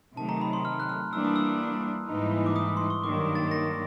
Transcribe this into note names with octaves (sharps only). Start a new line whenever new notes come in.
C3 D#3 F#3 A3 A5
A#5
B5
C6
F6
F#6
F6
E3 G3 A#3 D4 E6
D#6
E6
G#2 E3 G3 A#3 D#4
D6
D#6
C6
C#6
G2 D#3 F#3 A#3 D6
A6
A#6